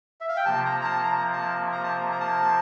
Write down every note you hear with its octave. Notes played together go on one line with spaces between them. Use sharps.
E5
F5
G5
C3 F3 A#3 A5
A#5
A#5
A5
A#5
A5
A#5
A5
A#5
A#5
A5